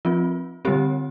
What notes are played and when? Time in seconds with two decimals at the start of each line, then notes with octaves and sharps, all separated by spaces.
0.05 F3 C4 F4
0.65 D3 G3 C4 G4